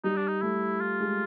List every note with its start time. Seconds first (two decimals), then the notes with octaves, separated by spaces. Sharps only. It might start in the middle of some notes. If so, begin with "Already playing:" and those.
0.04 G3 D#4
0.17 D4
0.28 D#4
0.42 A3 E4
0.81 F4
1.00 G#3